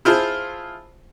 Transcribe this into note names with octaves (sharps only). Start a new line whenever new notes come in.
E4 F4 G#4 C5 A5